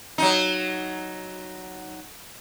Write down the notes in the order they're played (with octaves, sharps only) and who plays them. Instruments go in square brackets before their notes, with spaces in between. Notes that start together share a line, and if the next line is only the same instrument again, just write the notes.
[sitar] F#3 D#4